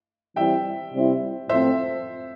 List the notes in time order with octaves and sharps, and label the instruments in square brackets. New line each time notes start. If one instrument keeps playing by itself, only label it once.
[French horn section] E3 G3 C4 E4 [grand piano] E5 G5
[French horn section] C3 G3 C4 E4
[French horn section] A2 F3 A3 C4 [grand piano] C5 E5